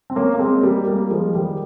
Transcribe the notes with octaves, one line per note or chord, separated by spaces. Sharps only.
C4
A#3 C#4
A#3
G#3 C4
G3 A#3
G3 A#3
F3 G#3
D#3 G3